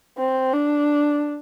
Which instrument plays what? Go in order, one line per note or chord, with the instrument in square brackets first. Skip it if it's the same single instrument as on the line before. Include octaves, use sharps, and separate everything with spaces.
[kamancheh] C4
D4